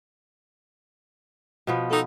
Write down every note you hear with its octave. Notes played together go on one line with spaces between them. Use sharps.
B2 F3 B3
D#4 A4